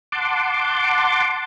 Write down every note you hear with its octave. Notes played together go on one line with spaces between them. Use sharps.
F#5 A5 C6 D6